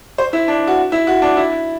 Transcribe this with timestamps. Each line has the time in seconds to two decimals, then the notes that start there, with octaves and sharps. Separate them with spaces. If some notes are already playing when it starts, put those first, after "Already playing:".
0.18 C5
0.33 E4
0.48 D4
0.67 F#4
0.92 E4
1.07 F#4
1.22 D4
1.37 E4